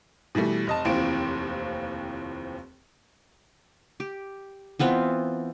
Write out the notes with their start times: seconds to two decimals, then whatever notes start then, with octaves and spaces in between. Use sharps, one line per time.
0.35 B2 E3 G3 A3
0.67 F1 D#5 A5
0.85 F1 D#2 E3 C4 F4 D7
4.00 G4
4.79 E3 B3 C4 F4